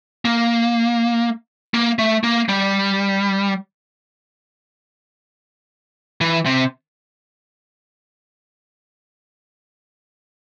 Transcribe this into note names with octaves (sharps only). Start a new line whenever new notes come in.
A#3
A#3
A3
A#3
G3
E3
C3